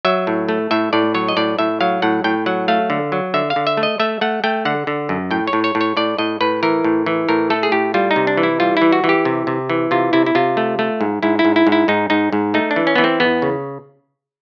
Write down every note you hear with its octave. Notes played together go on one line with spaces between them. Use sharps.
F#3 E5
A2
A3
A2 E5
A2 D5
F#3 C#5
D#5
A2 D5
A2 E5
F#3 F5
A2 F#5
A2 G5
F#3 F#5
A3 F5
D3
F#3
D3 E5
F5
D3
E5
A3
D#5
A3 E5
A3 F#5
A3 G5
D3 F#5
D3
F#2
A2 G5
C#5
A2
C#5
A2
C#5
A2 D5
A2 D#5
A2 B4
E3 A#4
A2
E3
A2 A#4
A3 A4
G#4
A2 G4
G3 F4
D#4
C3
D4
E3
E4
G3 F4
E3 E4
F#4
E3
G4
C3
C3
E3
C3 F4
C3 E4
E4
C3 F4
A3
A3
G#2
G#2 E4
E4
G#2
E4
G#2
E4
G#2 D#4
G#2 D#4
G#2
A3 D#4
D4
E3
C#4
E3 B3
C4
E2 B3
C#3